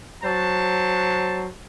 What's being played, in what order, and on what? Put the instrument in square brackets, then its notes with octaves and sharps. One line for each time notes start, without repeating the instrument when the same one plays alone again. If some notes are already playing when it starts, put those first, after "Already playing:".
[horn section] F#3 C5 A5